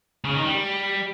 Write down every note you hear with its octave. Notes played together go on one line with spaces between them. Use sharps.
C#3
D#3
G3